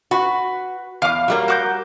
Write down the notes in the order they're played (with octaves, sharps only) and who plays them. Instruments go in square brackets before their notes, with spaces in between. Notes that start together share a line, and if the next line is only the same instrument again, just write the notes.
[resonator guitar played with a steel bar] F#4 [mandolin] B4
[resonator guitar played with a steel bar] E2 [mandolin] F5 D6
[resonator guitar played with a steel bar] F#3 G3 A#3
[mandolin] F#4 D6 G6